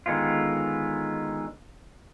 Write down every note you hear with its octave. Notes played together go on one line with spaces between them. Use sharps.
D3 D#3 G#3 B3 F4